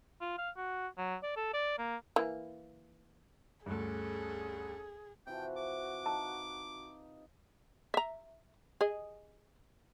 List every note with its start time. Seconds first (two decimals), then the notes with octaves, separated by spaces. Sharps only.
0.21 F4
0.38 F5
0.57 F#4
0.98 F#3
1.23 D5
1.37 A4
1.53 D5
1.78 A#3
2.16 E3 A#3
3.66 D2 G2 C#4 G#4 A4
5.27 C3 E3 F3 F#4 G5
5.57 D6
6.06 D#4 F5 A5
7.94 E5 A#5
8.81 G#4 D#5